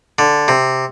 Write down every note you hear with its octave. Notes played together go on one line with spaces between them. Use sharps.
D3
C3